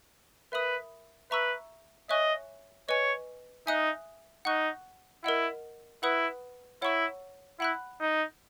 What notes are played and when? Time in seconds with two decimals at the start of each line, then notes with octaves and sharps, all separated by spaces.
0.52 A#4 B4 E5 B5 D#6
1.31 B4 E5 A#5 C#6 E6
2.09 C#5 D#5 E5 G#5 C#6 F#6
2.89 B4 C#5 D#5 G#5 C#6
3.67 D#4 E5 G#5 D#6 F#6
4.45 D#4 F#5 C#6 F#6
5.24 E4 A#4 D#5 F#5
6.03 E4 B4 F#5 B5 D#6 F#6
6.82 E4 C#5 F#5 A#5 C#6 E6
7.60 E4 F#5 B5 F#6
8.00 D#4